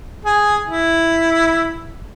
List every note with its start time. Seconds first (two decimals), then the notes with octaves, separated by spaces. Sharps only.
0.25 G#4
0.66 E4